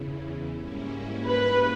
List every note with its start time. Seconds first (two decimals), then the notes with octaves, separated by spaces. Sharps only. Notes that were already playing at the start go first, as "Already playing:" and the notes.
Already playing: E2 C#3 E3
0.49 G#2 G3 A#3 C#4 E4
1.24 B4